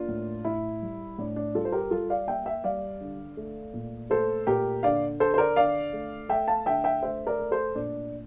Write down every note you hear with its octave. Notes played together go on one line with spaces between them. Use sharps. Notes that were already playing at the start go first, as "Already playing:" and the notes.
Already playing: A#3 D4 F4
A2
A2 E4
G3
A2 D4
D4
G3 F4 A4
C5
G4 A#4
G3 F4 A4
D5 F5
A#3 E5 G5
E5 G5
G3 D5 F5
D3
A3
A#2
A3 A4 C5
A#2 G4 A#4
D3 D5 F5
D3 A4 C5
C5
A#4 D5
D3 D5 F5
A3
A3 E5 G5
F5 A5
D3 E5 G5
E5 G5
A3 C5 E5
A#4 D5
A3
A4 C5
A#2 D4